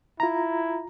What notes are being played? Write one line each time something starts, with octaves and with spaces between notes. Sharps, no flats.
E4 F4 A#5